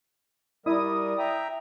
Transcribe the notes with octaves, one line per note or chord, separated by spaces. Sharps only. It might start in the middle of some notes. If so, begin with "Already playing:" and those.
G3 E4 A#4 D5 D#6
E5 G5 A#5